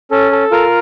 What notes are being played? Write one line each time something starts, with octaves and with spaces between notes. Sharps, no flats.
C#4 A4
A4
F4 A#4